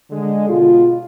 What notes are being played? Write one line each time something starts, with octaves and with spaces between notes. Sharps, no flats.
D3 G#3
B2 F4